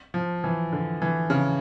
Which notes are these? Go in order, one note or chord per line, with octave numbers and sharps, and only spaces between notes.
F3
E3
D3
E3
C#3